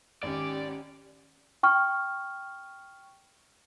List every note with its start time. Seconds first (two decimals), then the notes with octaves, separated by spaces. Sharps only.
0.23 G#1 C#4 G4 D5
1.63 G5 C#6 F6